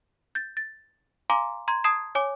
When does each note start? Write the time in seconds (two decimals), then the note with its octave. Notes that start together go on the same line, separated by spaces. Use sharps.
0.35 G6 A6
0.57 A6
1.30 F5 G#5 A#5 C6 D6
1.68 A#5 C6 G#6
1.84 A5 D#6 G#6 C7 E7
2.15 C#5 G#5 D6